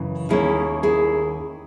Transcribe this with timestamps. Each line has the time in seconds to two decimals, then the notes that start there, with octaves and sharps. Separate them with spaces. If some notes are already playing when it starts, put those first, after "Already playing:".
Already playing: F#2 C#3 E3
0.29 D#2 D#3 A#3 C#4 E4 G#4
0.83 E4 G#4